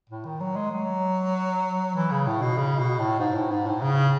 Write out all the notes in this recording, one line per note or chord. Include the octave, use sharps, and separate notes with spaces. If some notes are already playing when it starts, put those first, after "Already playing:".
A2
D#3
F#3
G#3
F#3
E3
C#3
A2
B2
C#3
B2
A2
G#2
A2
G#2
A2
C#3